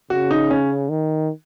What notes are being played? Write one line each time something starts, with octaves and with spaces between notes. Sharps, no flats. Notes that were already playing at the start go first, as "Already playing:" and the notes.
C#3 F#4
D#4
C#4
D#3